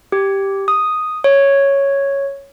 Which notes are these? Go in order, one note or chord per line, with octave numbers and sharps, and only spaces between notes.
G4
D#6
C#5